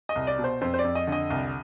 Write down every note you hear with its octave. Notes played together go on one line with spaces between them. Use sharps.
D#5
C2
D5
B2
C5
F2 C5
C5
D5
F2
D#5
D3 D#5
C2